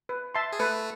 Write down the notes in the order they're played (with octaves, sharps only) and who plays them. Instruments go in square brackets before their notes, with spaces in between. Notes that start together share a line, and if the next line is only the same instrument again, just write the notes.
[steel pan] B4
E5 A5 C6
[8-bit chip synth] G#4
[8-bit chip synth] A3 A4 [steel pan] B4